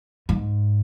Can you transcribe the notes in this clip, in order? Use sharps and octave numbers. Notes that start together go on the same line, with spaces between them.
G#2